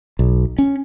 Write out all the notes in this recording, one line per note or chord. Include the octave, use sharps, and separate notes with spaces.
B1
C#4